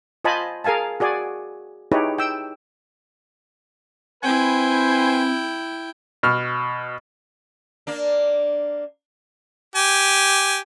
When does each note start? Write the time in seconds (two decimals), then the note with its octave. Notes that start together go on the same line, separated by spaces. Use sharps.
0.25 F4 C5 D#5 G#5 A5 B5
0.64 G#4 A#4 F5 G#5 A5
1.00 F#4 G#4 D5 G#5
1.92 D#4 E4 G4 G#4 B4 C#5
2.18 G5 E6
4.23 C4 E4 B4 C5 G5 G#5
6.23 B2 F6
7.87 A#3 D4
9.76 G4 G#5